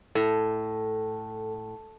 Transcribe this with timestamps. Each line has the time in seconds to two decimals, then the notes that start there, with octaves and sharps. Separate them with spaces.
0.15 A2 A4